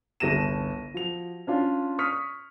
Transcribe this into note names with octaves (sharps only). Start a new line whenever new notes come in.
G1 C2 A#6 D#7 E7
F3 F#4 F7
C#4 D4 F4
C#6 D#6 F6 B6